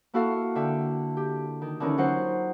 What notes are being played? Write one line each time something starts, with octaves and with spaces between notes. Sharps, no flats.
A#3 E4 F#4 A4 F5
D3 E5 G5
G4
D#3
D3 E3 C#4 D#4 A#4
F#3 D#4 F4 C5 F#5